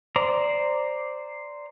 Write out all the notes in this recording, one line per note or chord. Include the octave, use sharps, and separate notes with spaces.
C5 D5 A#5